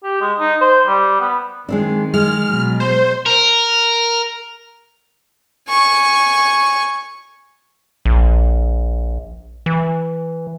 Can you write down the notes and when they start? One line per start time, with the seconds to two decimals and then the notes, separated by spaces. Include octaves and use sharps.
0.03 G4
0.21 G#3
0.40 D#4
0.61 C5
0.87 G3
1.20 B3
1.69 D#3 G#3 C4 D4
2.14 G#3 F6
2.47 B2 F#3
2.80 C5
3.26 A#4
5.69 G#5 C#6
8.05 A#1
9.66 E3